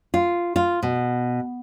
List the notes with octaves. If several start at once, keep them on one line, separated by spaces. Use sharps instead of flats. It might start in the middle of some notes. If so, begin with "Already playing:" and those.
F4
F4
B2